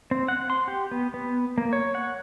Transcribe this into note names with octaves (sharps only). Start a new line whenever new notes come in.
C4
F#5
C6
G4
B3
B3
A#3
C#5
F#5